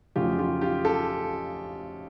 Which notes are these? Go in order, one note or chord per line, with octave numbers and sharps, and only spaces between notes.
F2 C#3 F#3 A3 F4 G4
F4 G4
F4 G4
G4 A4